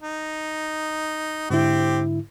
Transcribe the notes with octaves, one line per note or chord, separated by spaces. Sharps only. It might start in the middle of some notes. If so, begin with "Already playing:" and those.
D#4
G#2 D3 C4 E4 G4